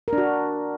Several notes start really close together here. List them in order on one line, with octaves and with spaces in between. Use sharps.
A#4 D4 F#4